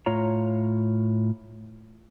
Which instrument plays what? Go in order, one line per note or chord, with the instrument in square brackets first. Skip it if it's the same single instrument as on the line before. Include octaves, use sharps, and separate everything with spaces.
[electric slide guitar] A2 F4 C#5 A#5